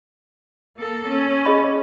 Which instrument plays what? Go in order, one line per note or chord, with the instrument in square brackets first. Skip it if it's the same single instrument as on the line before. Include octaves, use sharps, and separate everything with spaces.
[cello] A#3 A4
C#4
[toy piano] G#4 D#5 B5